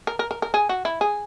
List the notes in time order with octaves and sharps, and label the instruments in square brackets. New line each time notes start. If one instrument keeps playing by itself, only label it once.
[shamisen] A#4
A#4
A#4
A#4
G#4
F#4
E4
G#4